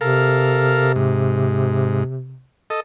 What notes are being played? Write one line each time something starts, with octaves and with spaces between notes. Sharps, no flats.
C3 A4 A#4 F5
G#2
A4 D#5